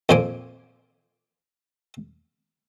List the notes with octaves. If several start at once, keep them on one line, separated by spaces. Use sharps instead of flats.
F2 A#2 C5 G#5 D6